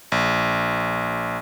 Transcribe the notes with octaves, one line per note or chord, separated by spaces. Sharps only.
A#1